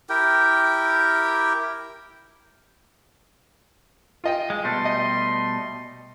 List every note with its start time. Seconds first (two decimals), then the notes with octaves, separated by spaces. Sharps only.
0.09 E4 G4 A#4 G5
4.24 F4 D#5 G5
4.50 G#3
4.64 B2 G3 A3 C6
4.85 D#5